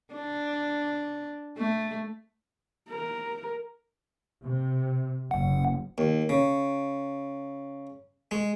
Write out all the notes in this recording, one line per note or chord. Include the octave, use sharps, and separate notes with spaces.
D4
A3
A#4
C3
F#1 F#5
D#2
C#3
G#3